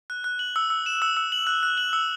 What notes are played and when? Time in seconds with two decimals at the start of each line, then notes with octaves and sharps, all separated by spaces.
0.10 F#6
0.24 F#6
0.39 F#7
0.56 E6
0.70 E6
0.86 E7
1.02 E6
1.17 E6
1.32 F#7
1.47 F#6
1.63 F#6
1.78 F#7
1.93 E6